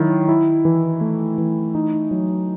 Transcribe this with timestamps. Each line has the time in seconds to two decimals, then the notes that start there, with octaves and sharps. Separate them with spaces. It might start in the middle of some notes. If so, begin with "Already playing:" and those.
Already playing: D#3 F#3 E4
0.29 E4
0.65 E3
1.01 A3
1.38 E3
1.75 D#4
2.11 F#3